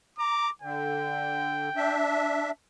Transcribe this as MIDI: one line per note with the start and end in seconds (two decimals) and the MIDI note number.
0.18 0.50 82
0.18 0.50 86
0.62 1.69 50
0.62 1.99 79
1.76 2.51 62
1.76 2.51 76